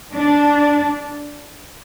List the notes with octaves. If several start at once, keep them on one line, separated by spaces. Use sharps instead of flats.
D4